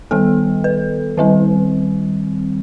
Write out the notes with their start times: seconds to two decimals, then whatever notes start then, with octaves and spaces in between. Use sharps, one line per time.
0.11 D#3 G3 B3 A4
0.64 B4
1.18 D#3 G3 C4